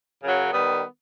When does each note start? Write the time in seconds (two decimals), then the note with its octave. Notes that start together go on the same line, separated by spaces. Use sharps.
0.22 F#2 C#3 F#3
0.52 D#3 G3 B3